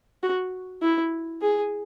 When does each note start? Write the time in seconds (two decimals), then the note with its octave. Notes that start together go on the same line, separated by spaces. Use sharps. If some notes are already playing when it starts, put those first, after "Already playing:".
0.23 F#4
0.82 E4
1.42 G#4